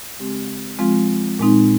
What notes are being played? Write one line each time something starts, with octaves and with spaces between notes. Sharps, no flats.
C#3 G#3 C4 G4
F3 G#3 C4 F4
A#2 G#3 C4 D#4